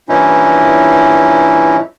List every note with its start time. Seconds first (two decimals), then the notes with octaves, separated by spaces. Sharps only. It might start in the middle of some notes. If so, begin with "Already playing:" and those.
0.09 G2 A#2 E3 C#4 D#4 E4